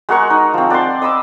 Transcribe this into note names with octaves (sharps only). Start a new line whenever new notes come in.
G#3 F#4 A#4 C#6
D#4
F3 C4
D5 F#5 A5 C6
D#5 B5 D6 E6